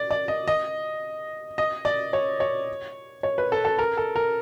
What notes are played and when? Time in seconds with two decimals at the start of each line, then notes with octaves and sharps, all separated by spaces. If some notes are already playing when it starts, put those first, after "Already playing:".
Already playing: D5
0.11 D5
0.28 D#5
0.48 D#5
1.58 D#5
1.85 D5
2.13 C#5
2.40 C#5
3.23 C#5
3.38 B4
3.52 A4
3.65 A4
3.79 A#4
3.97 A4
4.16 A#4